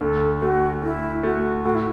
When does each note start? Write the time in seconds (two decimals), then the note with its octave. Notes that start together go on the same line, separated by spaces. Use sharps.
0.01 D2 A4
0.42 A3 F#4
0.82 A3 E4
1.23 A3 F#4
1.64 A2 F#4
1.75 E4